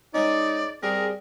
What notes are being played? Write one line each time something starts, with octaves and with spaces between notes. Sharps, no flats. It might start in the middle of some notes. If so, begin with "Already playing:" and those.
G#3 C#4 D#4 D5
G3 C4 G#4 A#4